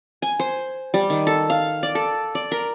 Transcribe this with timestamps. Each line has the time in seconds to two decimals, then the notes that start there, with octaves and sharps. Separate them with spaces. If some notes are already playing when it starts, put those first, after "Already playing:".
0.22 G#5
0.39 C5
0.94 G3
1.10 D#3
1.27 A4
1.50 F5
1.83 D5
1.95 A4
2.35 D5
2.52 A#4